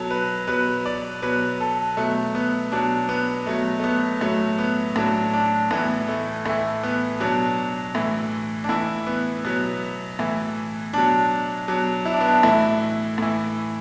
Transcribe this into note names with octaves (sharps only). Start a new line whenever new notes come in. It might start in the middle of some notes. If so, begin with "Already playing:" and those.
Already playing: B2 F#3 A4
B4
B2 F#3 B4
D5
B2 F#3 B4
A4
B2 F#3 A3
B3
B2 F#3 D4
B3
B2 F#3 A3
A3
B3
A2 F#3 A3
B3
A2 F#3 D4
D4
A2 E3 B3
A3
A2 E3 A3
B3
B2 F#3 D4
A2 E3
D4
A2 E3 E4
B3
B2 F#3 B3
A2 E3
B2 F#3 D4
B2 F#3 D4
E4
D4
B3
D4
A2 E3 E4
A2 E3